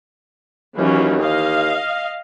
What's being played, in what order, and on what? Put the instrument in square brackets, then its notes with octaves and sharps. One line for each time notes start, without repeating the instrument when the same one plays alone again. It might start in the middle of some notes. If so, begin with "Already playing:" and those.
[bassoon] D#2 [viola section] E3 F#3 C#4
[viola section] D#5 F5